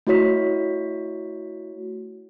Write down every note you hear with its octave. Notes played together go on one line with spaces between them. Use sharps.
A3 E4 F#4 C#5 B6